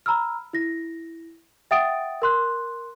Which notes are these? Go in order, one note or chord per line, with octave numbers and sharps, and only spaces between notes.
A#5 B5 E6 F6
E4 A#6
E5 F#5 G5 D#6 A6 D7
A#4 C6 F#6